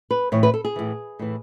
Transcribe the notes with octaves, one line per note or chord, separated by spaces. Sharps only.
B4
A2 E3 C#5
B4
A4
G#4
A2 E3
A2 E3